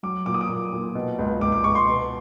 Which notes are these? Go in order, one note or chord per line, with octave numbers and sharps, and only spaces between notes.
F#3 D6
A#2 D6
D#6
D6
A#2
A#2
B2
C#2
C#2 D6
D6
C#2 C#6
C6
B2